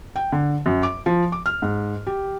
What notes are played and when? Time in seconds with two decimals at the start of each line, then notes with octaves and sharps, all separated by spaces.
0.16 G5
0.32 D3
0.66 F#2
0.83 D6
1.06 F3
1.32 D6
1.46 F6
1.62 G#2
2.07 G4